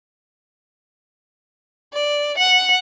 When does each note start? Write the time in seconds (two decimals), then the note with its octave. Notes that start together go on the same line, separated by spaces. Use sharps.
1.93 D5
2.38 F#5